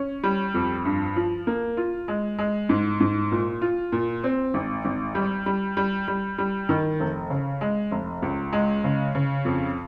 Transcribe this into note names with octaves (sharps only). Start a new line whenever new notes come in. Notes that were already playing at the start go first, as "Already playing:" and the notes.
Already playing: C#4
G3
F2
G2
F3
A#3
F4
G#3
G#3
G#2
G#2
A#2
F4
A#2
C4
G#1
G#1
G3
G3
G3
G3
G3
D#3
F1
C#3
G#3
F1
C#2
G#3
C#3
C#3
F2